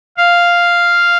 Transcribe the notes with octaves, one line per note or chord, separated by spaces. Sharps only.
F5